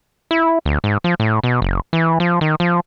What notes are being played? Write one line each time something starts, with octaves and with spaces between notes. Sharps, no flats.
E4
D2
G#2
F3
A2
B2
F#1
E3
F3
D#3
F3